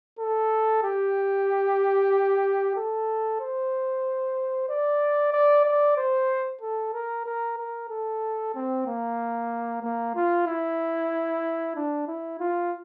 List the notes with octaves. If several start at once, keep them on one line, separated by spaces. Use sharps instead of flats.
A4
G4
A4
C5
D5
D5
D5
C5
A4
A#4
A#4
A#4
A4
C4
A#3
A#3
F4
E4
D4
E4
F4